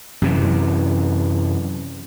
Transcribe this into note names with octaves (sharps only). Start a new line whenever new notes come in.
F#2 C3 E3